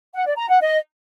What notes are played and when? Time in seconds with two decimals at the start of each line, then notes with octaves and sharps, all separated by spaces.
0.14 F#5
0.26 D5
0.38 A#5
0.49 F#5
0.61 D#5